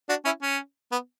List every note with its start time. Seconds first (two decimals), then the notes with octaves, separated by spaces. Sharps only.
0.09 D4 F#4
0.25 C#4 E4
0.42 C#4
0.92 B3